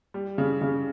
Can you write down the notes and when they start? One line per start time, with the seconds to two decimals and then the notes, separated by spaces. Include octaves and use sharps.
0.14 G3
0.38 C#3
0.61 C#3